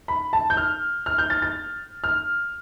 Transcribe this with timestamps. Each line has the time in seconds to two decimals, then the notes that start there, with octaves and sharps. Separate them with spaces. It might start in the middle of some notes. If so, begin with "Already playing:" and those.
0.08 B5
0.33 A5
0.50 G6
0.57 F6
1.06 F6
1.18 G6
1.30 A6
1.42 A6
2.04 F6